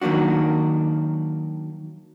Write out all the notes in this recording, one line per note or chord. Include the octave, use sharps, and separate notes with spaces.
D#3 F#3 A#3 D4 F#4